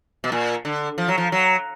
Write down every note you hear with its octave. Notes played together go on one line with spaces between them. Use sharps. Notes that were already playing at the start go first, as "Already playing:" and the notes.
B2
A#2
D3
F3
F#3
F3
F#3